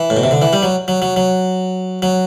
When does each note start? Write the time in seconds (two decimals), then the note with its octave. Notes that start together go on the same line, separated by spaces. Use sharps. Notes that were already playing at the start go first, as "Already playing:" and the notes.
Already playing: E3
0.10 A2
0.17 B2
0.24 C3
0.31 D3
0.42 E3
0.53 G3
0.63 F#3
0.88 F#3
1.02 F#3
1.16 F#3
2.02 F#3